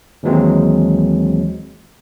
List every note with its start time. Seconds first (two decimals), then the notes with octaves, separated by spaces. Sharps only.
0.23 D#2 E3 F#3 G#3 C4